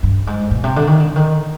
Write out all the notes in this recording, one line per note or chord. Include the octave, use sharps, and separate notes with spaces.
G2
G#2
A#2
C3
D3
D#3
D3
D#3